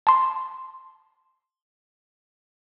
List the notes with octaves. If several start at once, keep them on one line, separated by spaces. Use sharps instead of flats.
A5 C6